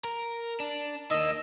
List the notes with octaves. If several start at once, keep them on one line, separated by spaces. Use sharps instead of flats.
A#4
D4
D#3 A#3 D#5 E6